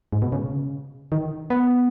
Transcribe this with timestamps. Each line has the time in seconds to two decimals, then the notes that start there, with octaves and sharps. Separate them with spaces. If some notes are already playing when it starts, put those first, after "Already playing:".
0.12 G#2
0.22 B2
0.32 C#3
1.12 D#3
1.50 B3